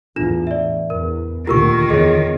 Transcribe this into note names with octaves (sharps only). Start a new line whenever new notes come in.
E2 A2 D4 F4 E7
D5 E5
E2 A#4
D2 A#2 D#3 F4 G4 A#4 C#6
E2 G#4 C#5 D#5